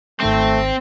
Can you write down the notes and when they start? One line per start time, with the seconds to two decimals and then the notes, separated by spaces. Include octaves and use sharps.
0.21 G#1 D#3 A3 C4 A#6